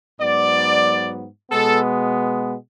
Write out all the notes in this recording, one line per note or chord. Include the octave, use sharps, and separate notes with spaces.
G#2 F#3 B3 D5
B2 G#3 B3 A4